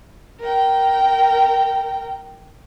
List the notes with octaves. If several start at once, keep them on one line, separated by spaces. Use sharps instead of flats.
A#4 G5